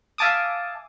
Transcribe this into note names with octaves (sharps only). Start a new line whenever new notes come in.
E5 F5 G#5 A5 D6 D#6